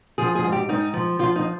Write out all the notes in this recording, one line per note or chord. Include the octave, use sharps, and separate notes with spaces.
F3 G#4
G#4
G#2
G4
G#2 D#4
F3
F3 F4
D#4